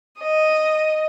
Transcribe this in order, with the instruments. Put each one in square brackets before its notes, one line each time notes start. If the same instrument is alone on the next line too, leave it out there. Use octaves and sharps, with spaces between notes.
[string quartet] D#5